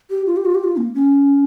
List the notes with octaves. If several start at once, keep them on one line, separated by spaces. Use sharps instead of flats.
G4
F4
G4
F4
G4
F4
A#3
C#4